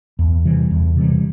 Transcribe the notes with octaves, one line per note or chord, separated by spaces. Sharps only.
E2
C3 E3 G3
E2
C3 E3 G3